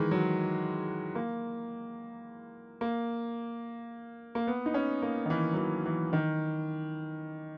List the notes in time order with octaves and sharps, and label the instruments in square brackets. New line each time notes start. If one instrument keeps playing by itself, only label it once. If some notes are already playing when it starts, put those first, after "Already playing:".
Already playing: [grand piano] D#3 E3 G#3
F#3
A#3
A#3
A#3
B3
D#4
C#4
A#3
D#3
E3
F#3
E3
E3
D#3